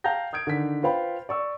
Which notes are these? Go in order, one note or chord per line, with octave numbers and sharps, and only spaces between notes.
F5 G5 A5 A#5 G6 A#6
D#6 G6 G#6 D7
D3 D#3 B6
F4 B4 C5 F5 G5 B5
D5 C#6 E6